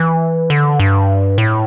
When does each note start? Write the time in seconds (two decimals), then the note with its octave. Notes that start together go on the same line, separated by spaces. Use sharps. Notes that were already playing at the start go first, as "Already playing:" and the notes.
Already playing: E3
0.50 D3
0.80 G2
1.38 A2